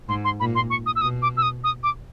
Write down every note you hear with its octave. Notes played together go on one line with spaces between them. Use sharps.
G#2 C6
C6
A#2 B5
C6
C#6
D#6
E6
B2 D#6
D6
E6
D#6
D#6
D6